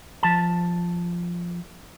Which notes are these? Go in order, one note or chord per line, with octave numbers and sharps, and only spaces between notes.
F3 A5